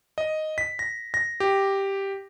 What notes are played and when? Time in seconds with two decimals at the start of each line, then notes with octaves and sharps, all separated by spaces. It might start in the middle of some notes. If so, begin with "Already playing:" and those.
0.18 D#5
0.58 B6
0.79 A#6
1.14 A#6
1.40 G4